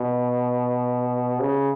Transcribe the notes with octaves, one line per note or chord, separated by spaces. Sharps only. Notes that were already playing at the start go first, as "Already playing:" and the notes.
Already playing: B2
C#3